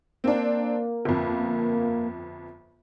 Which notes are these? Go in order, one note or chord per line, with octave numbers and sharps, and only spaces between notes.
A#3 C4 D4
G1 F2